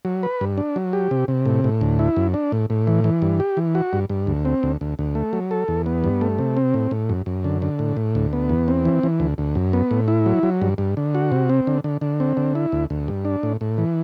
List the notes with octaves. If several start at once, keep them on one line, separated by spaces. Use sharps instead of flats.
F#3
B4
G2
D4
F#3
G4
C3
C3
A2
A2
D2
E4
F#2
D4
A2
A2
E3
E3
G2
G4
E3
F#4
G2
G2
D2
C4
D2
D2
D2
A3
F#3
A4
E2
B3
G2
A3
C3
C4
A2
A2
F#2
F#2
D3
D3
A2
A2
D2
B3
E2
C4
E3
E3
D2
D2
F#2
B3
A2
E4
F#3
F#3
G2
G2
D3
F#4
C3
C4
D3
D3
D3
C4
D3
E4
D2
D2
G2
D4
A2
A2
E3